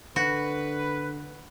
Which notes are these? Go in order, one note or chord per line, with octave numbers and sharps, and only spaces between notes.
D3 F#4 B4